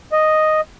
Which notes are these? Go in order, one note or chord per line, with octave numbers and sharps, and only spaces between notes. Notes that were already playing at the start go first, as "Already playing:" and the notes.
D#5